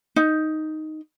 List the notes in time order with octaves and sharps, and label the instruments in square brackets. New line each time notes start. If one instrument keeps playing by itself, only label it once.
[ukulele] D#4